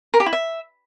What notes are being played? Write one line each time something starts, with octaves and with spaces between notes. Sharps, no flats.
A#4
G4
E4
E5